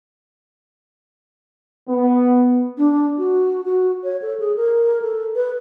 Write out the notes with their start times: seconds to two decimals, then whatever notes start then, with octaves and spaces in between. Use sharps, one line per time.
1.88 B3
2.78 D4
3.18 F#4
3.65 F#4
4.04 C#5
4.22 A4
4.40 G#4
4.57 A#4
5.02 A4
5.35 B4